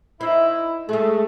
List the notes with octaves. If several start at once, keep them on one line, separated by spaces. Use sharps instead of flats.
D#4 E4 C5 E5
G#3 A3 G#4